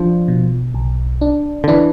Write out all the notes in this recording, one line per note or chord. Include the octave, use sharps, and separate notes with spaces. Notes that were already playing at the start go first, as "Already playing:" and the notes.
Already playing: F3 D4
B2
B1
D4
D3
E3 D4